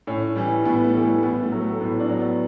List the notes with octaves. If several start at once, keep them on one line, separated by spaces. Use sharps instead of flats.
A2 C#4
E3 G3
A2 B3
A3
E3 G3
A3
A2 B3
A3
F#3
A3
A2 B3
D4
F#3
B3